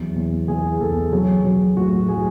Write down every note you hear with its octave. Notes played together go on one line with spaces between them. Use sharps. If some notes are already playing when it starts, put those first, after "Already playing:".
Already playing: E2 F#3
E2
E2 G#4
E2 A4
F#3 G#4
F#3
A2 F#4
F#3 G#4